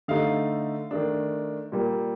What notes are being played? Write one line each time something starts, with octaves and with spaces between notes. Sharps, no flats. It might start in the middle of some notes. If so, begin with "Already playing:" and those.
D3 A3 D#4 F5
D#3 A3 D4
A#2 G3 A#3